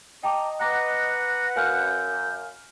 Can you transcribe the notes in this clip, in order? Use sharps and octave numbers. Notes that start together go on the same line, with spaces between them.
D#5 G5 A5 A#5 D6
B4 F#5 A#5 D6 A#6
F#2 F5 G#5 F6 G6